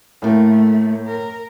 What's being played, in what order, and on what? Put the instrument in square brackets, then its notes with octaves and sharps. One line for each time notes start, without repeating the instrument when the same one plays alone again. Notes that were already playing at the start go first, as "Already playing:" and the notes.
[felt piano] A2 A#3 [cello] A3
[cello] A#4